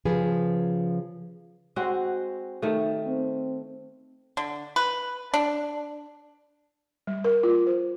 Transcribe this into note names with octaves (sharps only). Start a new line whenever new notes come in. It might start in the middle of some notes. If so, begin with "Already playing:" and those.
C#3 F3 G#4 B4
G#3 C4 F#4
D#3 A3
C4
D3
B4
D4
G3
A#4
F4
C5